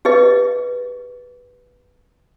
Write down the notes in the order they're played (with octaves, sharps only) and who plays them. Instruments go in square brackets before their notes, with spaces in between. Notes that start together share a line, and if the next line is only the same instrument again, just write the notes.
[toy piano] G4 G#4 B4 D#5